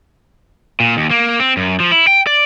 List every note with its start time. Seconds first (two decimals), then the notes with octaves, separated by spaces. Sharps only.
0.80 A#2
0.97 D#2
1.11 A#3
1.40 C4
1.57 F#2
1.80 F3
1.92 E4
2.07 G5
2.27 D5